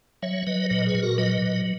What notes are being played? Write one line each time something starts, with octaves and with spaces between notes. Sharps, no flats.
F#3 C#5 E5
F#3 B4 D#5
A#2 B4 D#5
G#4 B4
A#2
F#4 A#4
F#3 B4 D#5
A#2